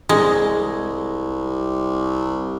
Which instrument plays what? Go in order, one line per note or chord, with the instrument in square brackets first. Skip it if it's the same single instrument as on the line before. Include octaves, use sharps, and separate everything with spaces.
[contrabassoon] C2 [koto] G#3